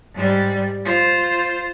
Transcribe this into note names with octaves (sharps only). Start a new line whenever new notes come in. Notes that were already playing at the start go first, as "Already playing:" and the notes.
G#2 G3
F4 C5